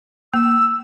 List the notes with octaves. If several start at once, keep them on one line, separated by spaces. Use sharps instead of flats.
A#3 E6